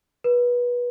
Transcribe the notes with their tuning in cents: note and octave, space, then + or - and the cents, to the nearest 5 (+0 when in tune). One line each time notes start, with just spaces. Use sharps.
B4 -25